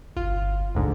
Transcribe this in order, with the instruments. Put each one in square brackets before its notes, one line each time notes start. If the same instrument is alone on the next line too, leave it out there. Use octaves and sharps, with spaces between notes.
[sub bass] G1 [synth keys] F4
[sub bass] A1 [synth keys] D2 G#2 D3